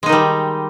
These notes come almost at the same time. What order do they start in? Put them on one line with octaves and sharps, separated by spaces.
G#3 D#4 D#3 G3